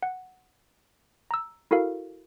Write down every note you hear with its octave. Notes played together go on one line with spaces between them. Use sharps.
F#5
A#5 E6
E4 F#4 A4 A#4 F5